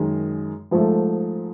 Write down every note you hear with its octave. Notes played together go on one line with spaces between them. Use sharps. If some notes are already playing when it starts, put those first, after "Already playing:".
Already playing: F#2 D#3 G#3
G#2 F3 A3